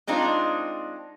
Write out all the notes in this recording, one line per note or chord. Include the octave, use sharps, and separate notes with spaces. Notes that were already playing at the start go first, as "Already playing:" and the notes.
G#3 C4 D4 D#4 F4